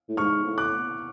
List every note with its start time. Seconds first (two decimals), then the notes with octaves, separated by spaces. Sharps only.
0.09 A2
0.17 G#2 C#6 F6
0.44 A2
0.58 D6 F#6